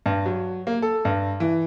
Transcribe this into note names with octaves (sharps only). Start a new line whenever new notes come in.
G2
F#3
A#3
A4
G2
E3